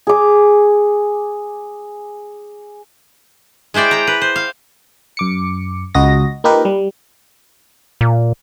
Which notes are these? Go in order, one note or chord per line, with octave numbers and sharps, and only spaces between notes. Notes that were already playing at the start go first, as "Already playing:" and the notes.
G#4 D6
G#3 E4 C5 D5 G5
G5 A#5
B4
C5
F5
F#2 D6 C#7
C#2 F#4 D#5 A#6
A#3 D#4 F4 G4 A#4 B4
G3
A#2